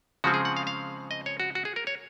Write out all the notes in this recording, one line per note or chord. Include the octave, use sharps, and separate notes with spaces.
C#3 F3 G#3 C4 F#4
G#4
F#5
F5
F5
D#5
C#5
F#4
F#4
G#4
A#4
C#5